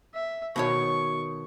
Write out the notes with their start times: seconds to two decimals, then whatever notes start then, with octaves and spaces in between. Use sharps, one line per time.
0.14 E5
0.56 B2 D#3 C#5 C#6